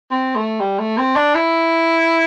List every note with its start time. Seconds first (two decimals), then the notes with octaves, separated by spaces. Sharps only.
0.11 C4
0.35 A3
0.60 G3
0.79 A3
0.98 C4
1.16 D4
1.35 E4